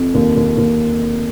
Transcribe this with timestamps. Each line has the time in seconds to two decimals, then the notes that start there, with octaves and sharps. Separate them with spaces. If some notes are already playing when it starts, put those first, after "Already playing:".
Already playing: F2
0.14 D#2
0.36 D#2
0.58 D#2